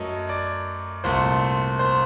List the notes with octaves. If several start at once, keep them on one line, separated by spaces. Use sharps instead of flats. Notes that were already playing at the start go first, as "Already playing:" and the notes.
Already playing: F#2 F#3 A3 D#5
D5
C2 A#2 A3 C5
C5